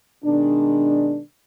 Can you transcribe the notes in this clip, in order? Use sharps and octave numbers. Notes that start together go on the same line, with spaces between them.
B2 D#3 G#3 D4